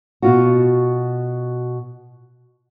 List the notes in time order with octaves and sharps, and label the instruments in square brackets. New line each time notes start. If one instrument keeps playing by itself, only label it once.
[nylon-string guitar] B2 F4 F#4